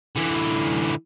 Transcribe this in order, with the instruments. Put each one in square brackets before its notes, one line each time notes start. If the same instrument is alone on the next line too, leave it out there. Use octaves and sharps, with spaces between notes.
[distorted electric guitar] D3 E3